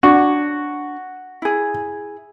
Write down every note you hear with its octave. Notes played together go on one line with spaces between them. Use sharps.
D4 F#4 C#5
E4 G#4